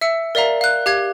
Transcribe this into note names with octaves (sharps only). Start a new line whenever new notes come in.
E5 E6 C#7
A#4 D5 E5 F5 A#5
F5 F#6
G4 F5 G#6